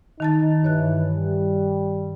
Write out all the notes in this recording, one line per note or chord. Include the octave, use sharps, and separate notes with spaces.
D#3 D#4 A5 A6
G2 E3 C#5 F#6
G3